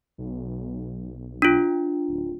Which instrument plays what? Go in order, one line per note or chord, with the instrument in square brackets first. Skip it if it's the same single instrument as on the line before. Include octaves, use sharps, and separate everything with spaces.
[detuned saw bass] B1
[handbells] D4 F4
[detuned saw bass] D1